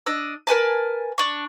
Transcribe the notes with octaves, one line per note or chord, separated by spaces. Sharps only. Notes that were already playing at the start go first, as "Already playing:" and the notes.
D4 D#5 E6
A#4 B4 G#5 A5
D4 C#6